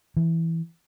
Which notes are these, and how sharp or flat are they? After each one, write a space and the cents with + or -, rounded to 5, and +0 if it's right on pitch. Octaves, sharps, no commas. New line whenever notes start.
E3 +0